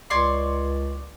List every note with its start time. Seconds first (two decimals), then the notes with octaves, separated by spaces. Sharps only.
0.10 C#2 C#5 D5 C6